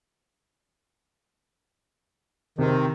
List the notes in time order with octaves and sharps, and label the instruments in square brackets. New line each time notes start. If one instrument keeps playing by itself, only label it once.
[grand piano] C3 C4 [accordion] D#3